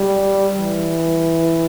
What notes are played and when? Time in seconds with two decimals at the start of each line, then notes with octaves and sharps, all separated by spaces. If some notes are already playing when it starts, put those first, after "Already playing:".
Already playing: G3
0.58 E3